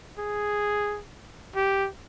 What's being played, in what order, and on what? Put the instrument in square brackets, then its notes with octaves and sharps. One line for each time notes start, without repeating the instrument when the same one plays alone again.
[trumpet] G#4
G4